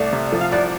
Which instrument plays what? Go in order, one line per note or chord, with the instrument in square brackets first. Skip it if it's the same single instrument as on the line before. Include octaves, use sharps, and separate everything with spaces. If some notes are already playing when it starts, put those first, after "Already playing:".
Already playing: [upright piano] C2 A3 [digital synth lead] D5
[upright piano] C3
F3
[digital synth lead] F5
[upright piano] C2 [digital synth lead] D5